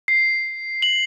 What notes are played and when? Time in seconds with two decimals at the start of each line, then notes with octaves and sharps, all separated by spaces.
0.08 C7
0.82 F#7